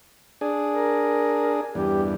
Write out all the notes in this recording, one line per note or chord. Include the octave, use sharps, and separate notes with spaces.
D4 G#4
A#4
E2 G2 G4